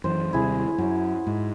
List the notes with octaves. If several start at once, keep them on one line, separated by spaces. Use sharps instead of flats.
F#2 E3 C5
D#2 C3 G3 E4 G#4
F#2 F#3
G#2